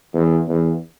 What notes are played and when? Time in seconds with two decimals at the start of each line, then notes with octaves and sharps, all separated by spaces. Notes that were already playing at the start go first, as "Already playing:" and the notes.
0.13 E2
0.48 E2